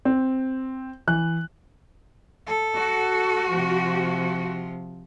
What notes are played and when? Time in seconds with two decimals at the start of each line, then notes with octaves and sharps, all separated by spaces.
0.05 C4
1.07 E3 F#6
2.47 A4
2.76 F#4
3.49 C3 F3